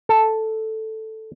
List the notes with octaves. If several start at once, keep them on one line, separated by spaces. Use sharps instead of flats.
A4